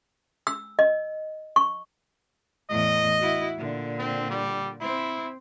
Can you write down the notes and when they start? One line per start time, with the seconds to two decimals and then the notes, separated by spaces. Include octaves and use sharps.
0.47 E6
0.79 D#5
1.56 C#6
2.70 E2 A2 D#5
3.20 E4 F#4
3.58 A#2 D3
3.99 C4
4.30 G3
4.81 C4 E4